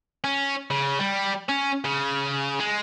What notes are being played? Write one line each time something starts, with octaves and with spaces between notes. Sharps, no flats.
C#4
C#3
G3
C#4
C#3
G#3